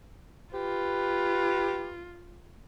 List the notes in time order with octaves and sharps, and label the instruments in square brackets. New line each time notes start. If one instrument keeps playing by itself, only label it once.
[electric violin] F4 [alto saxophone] G4 [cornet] B4